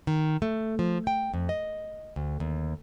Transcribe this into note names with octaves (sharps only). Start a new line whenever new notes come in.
D#3
A3
F3
G5
F2
D#5
D2
D#2